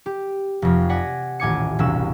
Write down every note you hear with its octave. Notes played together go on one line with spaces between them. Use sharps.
G4
F1 F2
D5 F#5 G#5 A#6 B6
D#1 A1 G#5 D6 G#6 C#7
E1 C2 E6